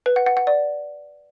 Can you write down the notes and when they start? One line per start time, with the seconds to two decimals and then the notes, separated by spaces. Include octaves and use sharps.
0.06 B4
0.16 F#5
0.26 F#5
0.37 F#5
0.47 D5